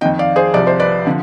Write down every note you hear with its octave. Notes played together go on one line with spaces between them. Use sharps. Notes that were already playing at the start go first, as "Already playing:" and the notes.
F2 D#3 D#5 G5
D5 F5
G#4 C5
C2 C3 F3 D5
C5
B4 D5
D3 F3